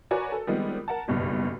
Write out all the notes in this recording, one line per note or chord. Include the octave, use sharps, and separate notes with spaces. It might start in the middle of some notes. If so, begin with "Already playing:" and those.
F#4 A#4 B4 C#5 D5 G#5
A4
D#3 F3 G3 G#3 B3 C4
A#4 F#5 A5
F#1 B1 G2